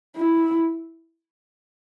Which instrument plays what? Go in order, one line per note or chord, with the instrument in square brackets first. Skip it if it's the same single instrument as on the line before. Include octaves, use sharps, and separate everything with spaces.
[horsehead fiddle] E4